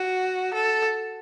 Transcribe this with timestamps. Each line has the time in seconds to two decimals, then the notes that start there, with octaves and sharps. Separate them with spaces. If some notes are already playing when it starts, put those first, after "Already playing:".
Already playing: F#4
0.54 A4